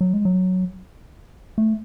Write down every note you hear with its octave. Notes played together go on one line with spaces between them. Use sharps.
F#3
G#3
F#3
A3